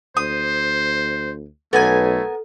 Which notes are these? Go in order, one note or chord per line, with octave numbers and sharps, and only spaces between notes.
D2 C5 D#6
B1 A3 B3 A4 A#4 G#5